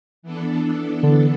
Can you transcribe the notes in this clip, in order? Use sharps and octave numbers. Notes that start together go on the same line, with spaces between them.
E3 B3 D4 A4
D3